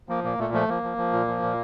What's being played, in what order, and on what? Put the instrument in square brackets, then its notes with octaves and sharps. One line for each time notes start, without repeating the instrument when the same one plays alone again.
[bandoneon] F3 A#3
A#2 A#3
A#2 A3
F3 A3
F3 A#3
F3
F3
A#2
F3
A#2